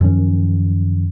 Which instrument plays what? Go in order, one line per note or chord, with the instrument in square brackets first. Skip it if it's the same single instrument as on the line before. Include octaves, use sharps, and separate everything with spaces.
[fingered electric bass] F#2 D#3 F3 C#4